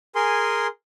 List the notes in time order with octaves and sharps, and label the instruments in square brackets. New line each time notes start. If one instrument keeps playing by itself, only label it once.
[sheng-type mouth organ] G#4 A#4 G#5 C6